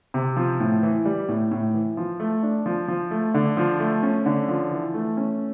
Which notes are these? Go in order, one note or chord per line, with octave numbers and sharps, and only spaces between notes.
C3
F3
A2
E3
G3
A2
A2
E3
F3
A3
D4
F3
F3
A3
D3
F3
A3
C#4
D3
F3
E3
A3
C#4